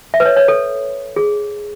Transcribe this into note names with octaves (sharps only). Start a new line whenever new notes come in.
E5
B4
C#5
C#5
A4
G#4